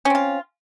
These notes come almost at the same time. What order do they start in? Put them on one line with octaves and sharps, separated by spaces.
C#4 C4 F4